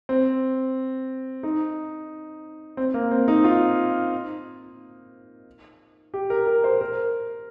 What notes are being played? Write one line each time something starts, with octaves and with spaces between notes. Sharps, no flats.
C4
D#4
C4
A#3
C4
D#4
F4
G4
A#4
A#4
C5
A#4